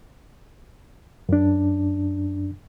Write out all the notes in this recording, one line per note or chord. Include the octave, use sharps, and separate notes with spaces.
F#2 D4